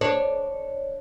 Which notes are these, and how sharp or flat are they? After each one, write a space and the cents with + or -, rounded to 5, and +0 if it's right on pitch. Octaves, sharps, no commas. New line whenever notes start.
D4 +0 C#5 -15